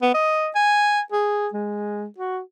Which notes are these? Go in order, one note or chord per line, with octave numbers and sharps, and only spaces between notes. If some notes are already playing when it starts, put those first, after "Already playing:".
B3
D#5
G#5
G#4
G#3
F#4